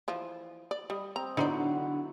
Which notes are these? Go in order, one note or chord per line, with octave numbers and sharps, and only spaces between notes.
E3 F3
D5
G3 D#5
C4 A#5
D3 F#3 B3 D#4 E4 C5 D5